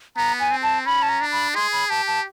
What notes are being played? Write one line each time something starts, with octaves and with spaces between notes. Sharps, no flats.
B3 A#5
G#5
C4
A5
C#4 B5
A5
A#5
D4
B5
G#4 C6
B5
G4 A5
A5